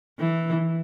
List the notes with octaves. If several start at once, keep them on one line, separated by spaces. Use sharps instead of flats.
E3